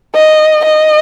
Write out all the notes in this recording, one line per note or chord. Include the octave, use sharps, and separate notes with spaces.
D#5
D#5